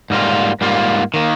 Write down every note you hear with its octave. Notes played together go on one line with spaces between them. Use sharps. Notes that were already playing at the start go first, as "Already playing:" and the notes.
G#2 G3 A#3 F4
G#2 G3 A#3 F4
D#3 A#3